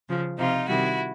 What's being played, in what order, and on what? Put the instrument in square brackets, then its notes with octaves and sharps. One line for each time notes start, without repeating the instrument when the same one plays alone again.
[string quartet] C#3 F3
C3 F3 D#4 F4
C3 D#3 G3 E4 F#4